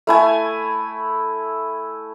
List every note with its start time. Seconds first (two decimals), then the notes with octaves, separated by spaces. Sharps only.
0.07 A3 E4 G#5